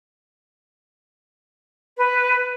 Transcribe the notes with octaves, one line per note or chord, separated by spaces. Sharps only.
B4